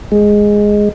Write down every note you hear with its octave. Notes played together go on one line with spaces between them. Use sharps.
G#3